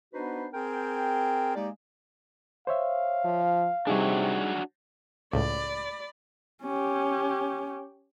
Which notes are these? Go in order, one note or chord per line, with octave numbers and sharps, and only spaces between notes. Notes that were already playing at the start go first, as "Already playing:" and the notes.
B3 D4 D#4 F#4 B4 C5
C4 G#4 A#4 G5
G#3 A#3 D#4 G4 D5
C5 C#5 E5 F5
F3
C3 G3 D4 D#4 F#4 G#4 C#5
C#2 A2 D5 B5
C#4 G4